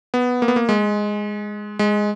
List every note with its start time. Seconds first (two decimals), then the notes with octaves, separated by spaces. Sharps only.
0.14 B3
0.42 A#3
0.48 B3
0.56 A#3
0.69 G#3
1.79 G#3